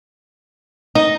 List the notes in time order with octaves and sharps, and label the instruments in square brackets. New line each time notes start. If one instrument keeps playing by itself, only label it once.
[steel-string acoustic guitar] D#4 [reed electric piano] D#5